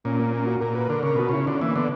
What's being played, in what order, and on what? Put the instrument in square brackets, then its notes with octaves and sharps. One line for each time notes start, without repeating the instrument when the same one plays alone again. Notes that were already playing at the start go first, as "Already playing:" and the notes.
[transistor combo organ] A#2 [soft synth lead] C#4
[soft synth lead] A#3
C#4
F#4
[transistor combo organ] A#2 [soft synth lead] A#4
[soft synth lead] B4
[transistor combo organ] D3 [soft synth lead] A#4
[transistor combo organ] C#3 [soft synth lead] A#4
[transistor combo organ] B2 [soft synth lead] F#4
[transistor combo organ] C#3 [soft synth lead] E4
[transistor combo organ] D3 [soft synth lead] C#4
[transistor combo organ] E3 [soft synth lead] A#3
[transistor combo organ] D3 [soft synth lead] B3